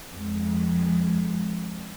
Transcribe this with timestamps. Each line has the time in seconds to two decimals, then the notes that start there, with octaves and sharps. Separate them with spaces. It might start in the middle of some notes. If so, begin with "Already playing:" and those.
0.10 F2 G#3